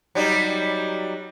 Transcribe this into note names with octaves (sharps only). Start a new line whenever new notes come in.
F#3 G3 D#4